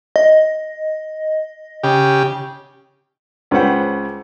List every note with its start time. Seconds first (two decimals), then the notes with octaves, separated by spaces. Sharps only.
0.16 D#5
1.83 C#3 G4
3.51 C#2 C#4 B4 C5 F#5 G5